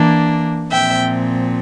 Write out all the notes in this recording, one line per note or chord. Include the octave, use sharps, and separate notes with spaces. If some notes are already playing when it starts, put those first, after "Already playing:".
Already playing: E3 A#3 D4
A#2 F3 C4 E5 G5